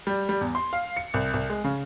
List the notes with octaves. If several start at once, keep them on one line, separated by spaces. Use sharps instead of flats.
G3
G3
E2
C6
F5
C#7
C2
C2
G#3
C#3